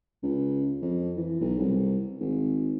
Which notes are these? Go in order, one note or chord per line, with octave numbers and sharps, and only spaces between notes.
C#2
F2
E3
B1
C2
G#1